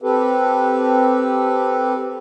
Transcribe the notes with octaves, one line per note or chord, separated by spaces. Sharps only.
C4 G4 A4 B4